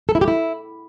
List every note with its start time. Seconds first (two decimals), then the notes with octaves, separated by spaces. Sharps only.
0.09 A4
0.15 E4
0.21 G4
0.28 E4